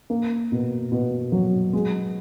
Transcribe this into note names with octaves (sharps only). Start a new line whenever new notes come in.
A#3
B2
B2
F#3
G#3